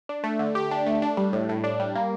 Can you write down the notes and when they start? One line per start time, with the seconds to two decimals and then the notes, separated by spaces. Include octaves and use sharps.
0.09 D4
0.24 A3
0.39 D3
0.55 G4
0.71 D4
0.86 A3
1.02 D4
1.17 G3
1.33 A2
1.49 A2
1.64 D4
1.80 G3
1.96 A#3